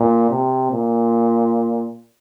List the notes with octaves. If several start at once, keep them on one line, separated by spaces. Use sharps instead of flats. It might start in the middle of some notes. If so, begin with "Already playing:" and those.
Already playing: A#2
C3
A#2